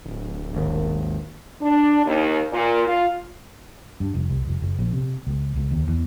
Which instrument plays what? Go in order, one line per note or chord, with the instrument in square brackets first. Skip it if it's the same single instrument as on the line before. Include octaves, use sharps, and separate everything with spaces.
[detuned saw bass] D1
[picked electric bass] G#1 D#2
[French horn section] D4
D#2
A#2
F4
[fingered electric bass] G2
F1
C2
F1
F#1
A#1
C3
C#2
C#2
D#2
E2